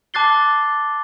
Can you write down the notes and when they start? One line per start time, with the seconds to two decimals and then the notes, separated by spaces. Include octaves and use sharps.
0.14 A5 D6 F#6 A6 C7 G7